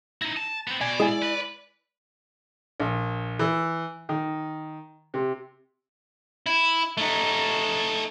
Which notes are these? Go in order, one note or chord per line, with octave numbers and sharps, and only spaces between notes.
D#4 E4 A#6
A5
B3 C4
B2 D5 G#5
G#3 E4 G#5
B4
A#1
E3
D#3
C3
E4
A3 D#4